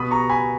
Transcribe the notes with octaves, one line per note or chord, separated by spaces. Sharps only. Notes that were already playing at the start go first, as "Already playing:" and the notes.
Already playing: B2 B5 D#6
A#5 C#6
G#5 B5